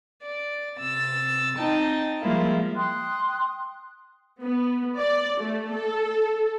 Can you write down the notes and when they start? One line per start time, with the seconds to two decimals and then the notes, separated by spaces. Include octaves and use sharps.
0.23 D5
0.79 C3 E6 A6
1.57 C4 D#4 G5 A5
2.22 F3 G3 G#3 A#3 E4 F4
2.76 G5 C6 D#6 F#6
4.42 B3
4.97 D5
5.40 A3
5.72 A4